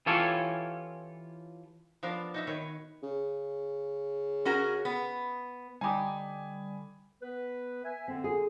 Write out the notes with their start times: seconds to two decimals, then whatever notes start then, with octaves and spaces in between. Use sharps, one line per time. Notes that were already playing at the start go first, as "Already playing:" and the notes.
0.06 E3 C#4 F4 G4 A4 C#5
2.03 F3 B3 D4 A#4 F5
2.34 D#4 F#4 E5
2.47 D#3 B4 C#5
3.03 C#3
4.45 C#4 F#4 A#4
4.85 B3
5.81 D3 G3 D#4 G4 G#5 B5 D#6
7.22 B3 B4
7.84 E5 G#5
8.08 D3 C4
8.24 G#4